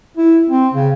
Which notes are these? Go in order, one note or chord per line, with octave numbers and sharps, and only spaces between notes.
E4
C4
C#3